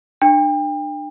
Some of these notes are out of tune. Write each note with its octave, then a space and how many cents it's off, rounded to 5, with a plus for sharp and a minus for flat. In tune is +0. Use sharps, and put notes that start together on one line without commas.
D4 +30 G5 +35